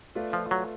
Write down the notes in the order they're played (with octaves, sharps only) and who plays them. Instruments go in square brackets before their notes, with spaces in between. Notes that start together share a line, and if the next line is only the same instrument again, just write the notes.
[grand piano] A3 F4 B4 D5
[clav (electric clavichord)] F3
F#3